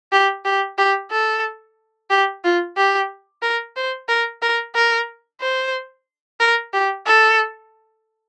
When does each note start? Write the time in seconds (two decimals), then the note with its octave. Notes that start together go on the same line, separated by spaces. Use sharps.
0.12 G4
0.45 G4
0.78 G4
1.11 A4
2.10 G4
2.44 F4
2.77 G4
3.42 A#4
3.76 C5
4.08 A#4
4.42 A#4
4.75 A#4
5.41 C5
6.40 A#4
6.73 G4
7.07 A4